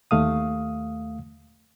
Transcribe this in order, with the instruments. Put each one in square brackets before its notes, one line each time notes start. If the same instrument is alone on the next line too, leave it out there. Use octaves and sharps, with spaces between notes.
[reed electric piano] D#2 A3 F5 D#6